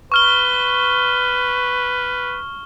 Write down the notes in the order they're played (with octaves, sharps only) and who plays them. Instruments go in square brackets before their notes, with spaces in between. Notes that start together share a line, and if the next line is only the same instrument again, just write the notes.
[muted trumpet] B4 [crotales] C#6 F6 G7